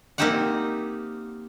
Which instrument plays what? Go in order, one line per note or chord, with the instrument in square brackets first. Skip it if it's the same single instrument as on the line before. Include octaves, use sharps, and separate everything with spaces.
[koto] A#3 C4 D#4 G4 E5 F#5